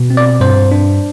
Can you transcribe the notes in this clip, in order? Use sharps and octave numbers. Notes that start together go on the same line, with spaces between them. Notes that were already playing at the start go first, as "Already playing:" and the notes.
Already playing: B2
C4
D5
G2 C5
D4